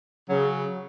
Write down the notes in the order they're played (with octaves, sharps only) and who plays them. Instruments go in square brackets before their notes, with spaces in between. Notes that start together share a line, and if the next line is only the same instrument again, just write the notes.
[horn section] C#3 F#3